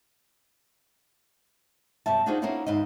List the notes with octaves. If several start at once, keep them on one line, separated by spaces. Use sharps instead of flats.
F#2 B2 G3 E5 A5
D4 D#4 F4 F#4 G#4 C5
A#3 B3 C#4 E4 F4
D#2 G#2 E4 D#5